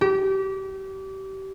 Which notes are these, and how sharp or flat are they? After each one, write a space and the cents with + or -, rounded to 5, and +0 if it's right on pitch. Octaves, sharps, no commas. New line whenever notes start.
G4 -30